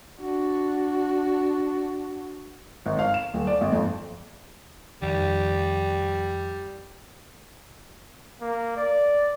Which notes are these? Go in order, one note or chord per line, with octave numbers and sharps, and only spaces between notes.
D4 F#4
G#1
F5
E7
D#1
D5
G#1
F2
F2 D#3 G3
A#3
D5